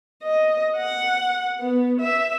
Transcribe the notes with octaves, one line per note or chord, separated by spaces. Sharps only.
D#5
F#5
B3
E5